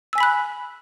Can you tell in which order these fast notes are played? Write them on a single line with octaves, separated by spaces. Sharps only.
E6 G#5 B6 B5 F#6